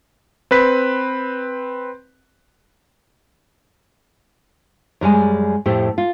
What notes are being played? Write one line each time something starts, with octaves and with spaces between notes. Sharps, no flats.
C4 B4 B6
F#2 G3 G#3 G#5
F2 A2 A3 G4
F4